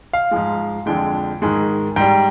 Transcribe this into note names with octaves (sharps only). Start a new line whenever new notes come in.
F5
G#2 F3 G#3
F2 D3 G#3 G5
G#2 D#3 G#3
G#2 G3 G5